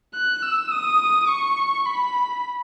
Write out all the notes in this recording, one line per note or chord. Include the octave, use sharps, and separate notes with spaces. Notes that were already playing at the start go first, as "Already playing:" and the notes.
F#6
E6
D#6
C#6
B5